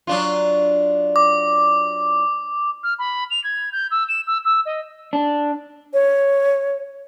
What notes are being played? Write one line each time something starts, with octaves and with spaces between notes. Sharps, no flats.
F#3 D4 F4
D6
F6
B5
F7
G#6
G6
E6
E7
E6
E6
D#5
D4
C#5